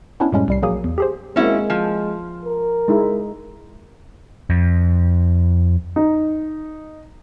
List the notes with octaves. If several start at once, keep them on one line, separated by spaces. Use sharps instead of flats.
B3 C#4 D4 E4
F#2 A2 G3 G#3 C#4
C2 G3 C7
A#1 F#3 A#3 G#4 D#6
E2
G4 G#4 C5
G#3 A#3 C4 C#4 E4 F#4
F3 G#5
A#4
G#3 D#4 E4
F2
D#4